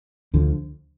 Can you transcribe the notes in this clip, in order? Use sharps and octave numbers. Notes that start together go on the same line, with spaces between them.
D2 D3 F3